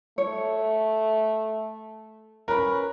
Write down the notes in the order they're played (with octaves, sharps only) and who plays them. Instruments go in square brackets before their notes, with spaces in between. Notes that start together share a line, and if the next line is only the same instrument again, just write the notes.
[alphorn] A3 [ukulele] C#5
[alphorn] C#4 [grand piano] A#4 [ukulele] B4 B5